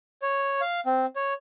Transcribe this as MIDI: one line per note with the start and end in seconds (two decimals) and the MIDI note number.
0.22 0.61 73
0.61 0.80 77
0.86 1.06 60
1.16 1.34 73